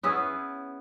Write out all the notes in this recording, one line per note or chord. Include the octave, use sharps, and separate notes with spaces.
B3 C#4 E4 G#4